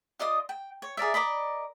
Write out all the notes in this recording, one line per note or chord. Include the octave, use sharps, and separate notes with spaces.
F4 D5 D#5 D#6
G5
C#5
G#4 A#4 D5 E5
A#4 D5 D#5 B5